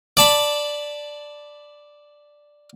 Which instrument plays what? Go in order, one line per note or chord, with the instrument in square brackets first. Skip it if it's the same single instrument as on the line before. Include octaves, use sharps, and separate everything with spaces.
[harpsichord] D5 A5 B5